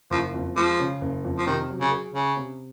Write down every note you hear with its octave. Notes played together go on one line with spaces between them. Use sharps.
F#1 F3
F2
F3 G#3
C#3
F#1
F2
F3
C3 D#3
F#3
C#3
G#4
C#3 C#4
C3